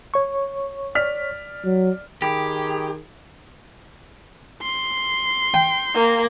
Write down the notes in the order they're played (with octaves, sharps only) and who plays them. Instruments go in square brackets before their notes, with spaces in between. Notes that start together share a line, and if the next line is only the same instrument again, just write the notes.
[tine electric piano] C#5 C#6
[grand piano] D5 F6 B6
[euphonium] F#3
[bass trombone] D#3 [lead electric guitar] G4 [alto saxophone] G#4 [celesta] G5 B5
[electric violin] C6
[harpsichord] G5
[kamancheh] A#3